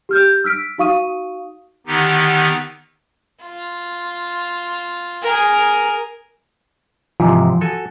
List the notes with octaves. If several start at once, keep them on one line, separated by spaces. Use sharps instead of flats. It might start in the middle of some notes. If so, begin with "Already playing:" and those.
G4 F6 G6
E6 F6 B6 D7
D#4 F#4 F5 C#6 D#6 D#7
D3 D#3 B3 D#4 G4
F4
G#4 A#4
G#2 C3 E3 F3 F4
F#4 A4 G#5